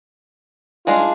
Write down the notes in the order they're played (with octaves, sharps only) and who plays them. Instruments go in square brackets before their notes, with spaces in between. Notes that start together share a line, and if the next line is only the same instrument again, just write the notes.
[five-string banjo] G#3 D4 G#4 [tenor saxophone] F4